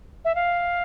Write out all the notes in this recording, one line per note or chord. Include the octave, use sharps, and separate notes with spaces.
E5
F5